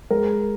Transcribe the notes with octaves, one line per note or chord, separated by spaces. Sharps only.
G#3 A#4